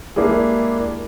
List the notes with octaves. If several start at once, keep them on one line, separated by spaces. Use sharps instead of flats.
G#3 A#3 D4 E4 G4 G#4